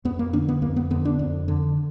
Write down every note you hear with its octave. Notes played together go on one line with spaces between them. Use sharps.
F2 B3
A#3
D3 D4
B3
F2 A#3
B3
D3 B3
D4
F2
D3